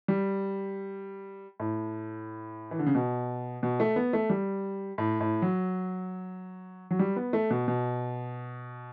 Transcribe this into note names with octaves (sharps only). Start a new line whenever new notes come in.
G3
A2
E3
D3
C#3
B2
B2
A3
B3
A3
G3
A2
A2
F#3
F#3
G3
B3
A3
B2
B2